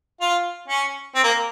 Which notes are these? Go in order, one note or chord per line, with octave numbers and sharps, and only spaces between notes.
F4
C#4
C4
A#3